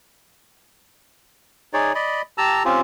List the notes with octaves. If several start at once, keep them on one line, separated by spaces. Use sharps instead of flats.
D#4 G#4 C#5 D5
D5 D#5 B5
G4 A5 A#5 E6
C4 C#4 F4 G4